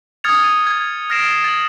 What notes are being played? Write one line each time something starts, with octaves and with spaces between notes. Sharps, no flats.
D#6 F6 G#6 A6 C#7 F7
D#7
G#6
F6 A6 A#6 C7 D7 E7
A6 F#7